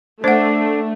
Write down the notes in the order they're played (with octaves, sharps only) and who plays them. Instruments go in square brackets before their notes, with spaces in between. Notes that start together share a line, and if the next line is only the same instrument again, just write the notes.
[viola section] A3 [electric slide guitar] D4 [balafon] C5 F#5